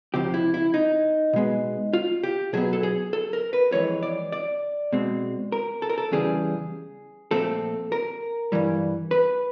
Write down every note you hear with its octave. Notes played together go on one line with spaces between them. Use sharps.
C#2 C3 F3 G4
E4
E4
D#4
B2 G#3 B3
F4
G4
B2 F#3 B3 G#4
A4
G#4
A4
A#4
B4
F2 C#3 E3 G#3 C#5
D5
D5
B2 G#3 C4
A#4
A4
A#4
A4
E2 C#3 E3 G3 G#4
A#2 F3 A3 C4 A4
A#4
G2 E3 G3
B4